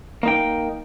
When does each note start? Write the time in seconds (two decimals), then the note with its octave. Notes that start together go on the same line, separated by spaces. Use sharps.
0.23 A#3 D#4 G5